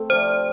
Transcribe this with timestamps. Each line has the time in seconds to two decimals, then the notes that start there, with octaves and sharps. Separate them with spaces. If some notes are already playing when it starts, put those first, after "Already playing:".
Already playing: A3 C4
0.10 C3 F3 D4 C5